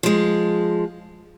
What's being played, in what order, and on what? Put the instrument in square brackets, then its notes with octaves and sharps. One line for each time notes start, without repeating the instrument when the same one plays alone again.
[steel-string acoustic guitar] F3 G#3